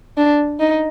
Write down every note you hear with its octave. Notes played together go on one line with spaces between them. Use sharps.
D4
D#4